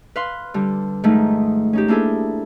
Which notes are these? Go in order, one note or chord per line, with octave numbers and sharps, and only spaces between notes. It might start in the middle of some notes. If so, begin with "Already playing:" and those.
B4 F5 C6
D3 G3
G#2 D#3 F3 A3 D#4
C#4 D#4 G4
A#3 D4 E4 G#4 A4